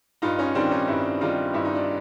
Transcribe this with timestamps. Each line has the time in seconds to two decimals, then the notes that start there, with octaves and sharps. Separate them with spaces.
0.22 G2 D#4 F4
0.39 C#4 D#4
0.55 D#3 G3 C4 D4
0.71 C#4 D#4
0.88 G2 D4 E4
1.21 D#3 G3 D#4 F4
1.54 G2 E4
1.65 D#4
1.75 D4